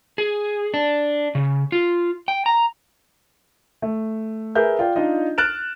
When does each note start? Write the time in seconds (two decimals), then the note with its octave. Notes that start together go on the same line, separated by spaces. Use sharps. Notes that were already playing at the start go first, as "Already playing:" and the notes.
0.18 G#4
0.74 D4
1.35 C#3
1.72 F4
2.28 G5
2.46 A#5
3.82 A3
4.55 G#4 A#4 B4 E5 G6
4.79 F4 D5 G5
4.96 D4 D#4 F4 D#5
5.38 F6 F#6 A6 D7 E7